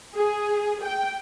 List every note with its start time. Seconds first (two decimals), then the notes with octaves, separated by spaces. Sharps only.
0.15 G#4
0.83 G5